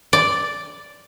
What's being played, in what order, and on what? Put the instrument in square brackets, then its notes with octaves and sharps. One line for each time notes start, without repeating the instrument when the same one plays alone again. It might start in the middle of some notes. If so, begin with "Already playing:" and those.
[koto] D5